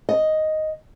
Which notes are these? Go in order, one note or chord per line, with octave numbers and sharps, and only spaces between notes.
D#5